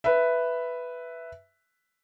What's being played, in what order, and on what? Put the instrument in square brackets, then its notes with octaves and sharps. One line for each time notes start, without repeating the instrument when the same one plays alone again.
[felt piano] B4 E5